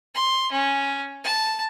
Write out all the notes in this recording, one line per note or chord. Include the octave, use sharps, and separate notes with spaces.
C6
C#4
A5